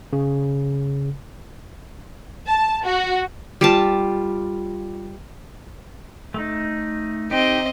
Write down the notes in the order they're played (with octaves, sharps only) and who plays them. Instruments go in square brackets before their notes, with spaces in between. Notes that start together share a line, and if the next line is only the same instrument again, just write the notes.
[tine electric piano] C#3
[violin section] A5
F#4
[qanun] G3 F4 A5
[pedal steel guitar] A3 D#4
[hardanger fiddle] C4 D#5 [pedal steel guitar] D#4 G4